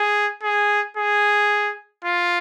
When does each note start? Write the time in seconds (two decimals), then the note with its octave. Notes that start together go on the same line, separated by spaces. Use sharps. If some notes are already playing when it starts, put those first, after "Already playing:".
Already playing: G#4
0.43 G#4
0.97 G#4
2.05 F4